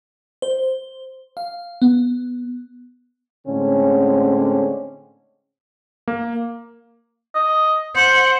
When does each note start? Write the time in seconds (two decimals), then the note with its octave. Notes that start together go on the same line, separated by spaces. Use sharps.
0.42 C5
1.37 F5
1.82 B3
3.47 A2 D3 G#3 C4 C#4
6.08 A#3
7.35 D#5
7.96 C5 F#5